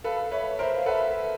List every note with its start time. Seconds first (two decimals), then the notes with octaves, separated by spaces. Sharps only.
0.04 A4 B4 F5
0.31 B4 C#5 E5
0.59 A#4 C5 E5
0.76 F5
0.86 A4 B4 F#5
0.91 E5